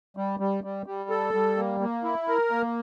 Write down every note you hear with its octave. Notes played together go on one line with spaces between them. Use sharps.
G3
G3
G3
G3
A4
G3
A#3
A#3
E4
A#4
A#3